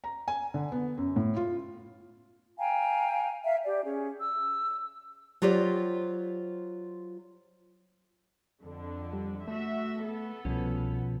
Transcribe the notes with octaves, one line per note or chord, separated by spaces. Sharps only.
A#5
G#5
D3
B3
F#2
A2
F4
F5 G5 G#5 A#5
E5 F5
G4 D5
C#4 G#4
E6
F#3 F4 G4 C5 D5
F2 D3
G3
A3 F#4 E5
B3 A4
C2 B2 F3 C#4